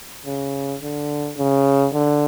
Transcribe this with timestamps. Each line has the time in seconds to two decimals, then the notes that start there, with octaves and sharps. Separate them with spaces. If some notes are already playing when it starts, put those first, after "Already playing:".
0.26 C#3
0.81 D3
1.37 C#3
1.94 D3